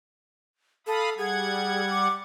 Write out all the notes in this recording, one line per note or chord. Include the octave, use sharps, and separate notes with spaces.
A4 F5 B5 D#6
G3 G#4 F#5 G#6
D6